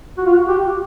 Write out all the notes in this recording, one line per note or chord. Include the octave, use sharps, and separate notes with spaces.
F#4
F4
F#4
G4